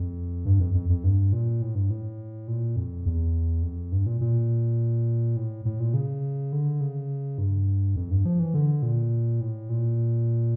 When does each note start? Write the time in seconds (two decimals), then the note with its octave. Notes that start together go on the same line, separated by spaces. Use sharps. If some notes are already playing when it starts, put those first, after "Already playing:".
Already playing: F2
0.45 G2
0.60 F2
0.74 F2
0.89 F2
1.04 G2
1.32 A#2
1.62 A2
1.75 G2
1.90 A2
2.48 A#2
2.76 F2
3.06 E2
3.63 F2
3.92 G2
4.06 A#2
4.21 A#2
5.36 A2
5.65 A2
5.80 A#2
5.94 C#3
6.52 D3
6.81 C#3
7.38 G2
7.96 F2
8.11 G2
8.25 F3
8.40 E3
8.54 D3
8.82 A#2
9.41 A2
9.69 A#2